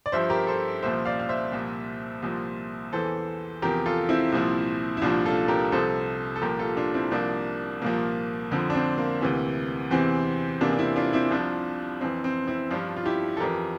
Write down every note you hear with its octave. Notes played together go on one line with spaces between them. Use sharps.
D5
G2 F3 C5 E5
G4 A#4
A4 C5
C2 A#2 F3 C5 E5
D5 F5
F5
C5 E5
C2 A#2 F3
C2 A#2 F3
E2 E3 A4 C5
E2 C3 F3 G4 A#4
F4 A4
C4 E4
C2 A#2 F3
E4
C2 A#2 F3 D4 F4
F4 A4
G4 A#4
C2 C3 F3 A4 C5
A4
C2 A#2 F3 G4 A#4
F4 A4
D4 F4
C4 E4
C2 C3 F3 A#3 D4
C2 A#2 F3 A#3
F2 D3 F3 C4
D4
C4
A#3
D2 C3 E3
E2 C3 E3 C4
E2 C3 E3 A#3 D4
D4
C4 E4
D4 F4
C4 E4
C2 C3 F3 D4 F4
F2 E3 C4
C4
C4 E4
G2 F3 D4 F4
F4
E4 G4
A4
F2 E3 G4 A#4